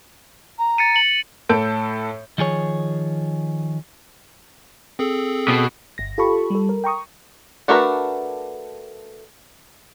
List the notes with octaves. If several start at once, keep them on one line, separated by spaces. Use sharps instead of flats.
A#5
A6 C#7 D#7
C#7 F#7
A2 A4 G6 D7
D#3 F3 G#4 C#5
C4 G#4 A4
B2
G1 A#6
F4 G4 A4 A5 B5 C#6
G3 A4
A#4
G5 A#5 C#6 D#6
A3 D4 F#4 A#4 B4